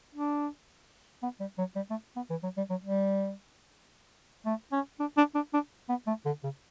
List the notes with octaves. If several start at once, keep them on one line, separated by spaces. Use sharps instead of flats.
D4
B3
G3
F#3
G3
A3
B3
E3
F#3
G3
F#3
G3
A3
C#4
D4
D4
D4
D4
B3
A3
D3
C#3